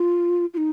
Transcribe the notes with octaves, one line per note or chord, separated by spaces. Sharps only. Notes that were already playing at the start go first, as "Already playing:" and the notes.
Already playing: F4
F4
D#4